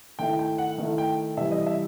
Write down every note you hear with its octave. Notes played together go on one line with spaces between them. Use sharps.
D#3 A3 E4 G5
G5
F#5
D#3 A3 E4
G5
C3 E3 G3 E5
D#5
E5